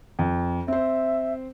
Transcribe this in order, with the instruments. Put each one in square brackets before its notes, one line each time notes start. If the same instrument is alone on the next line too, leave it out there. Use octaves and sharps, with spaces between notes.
[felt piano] F2
[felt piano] C4 C5 [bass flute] E5